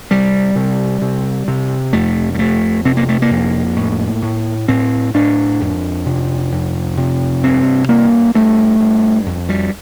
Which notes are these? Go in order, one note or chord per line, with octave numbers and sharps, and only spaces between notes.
C3 G3
C3
C3
C3
F2 A3
G3
F2 A3
C3 C4
A#3
A3
A#3
F2
A2
A2
A2 C4
A2 D4
F2
C3
F2
C3
G2 C4
G2 A#3
G2 A3
G2
F2
G3